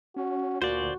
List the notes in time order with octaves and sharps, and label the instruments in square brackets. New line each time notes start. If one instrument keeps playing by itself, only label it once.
[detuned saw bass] C#4 [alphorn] F#4
[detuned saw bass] D2 [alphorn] A#2 [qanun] F#4 [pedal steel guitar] C5 D5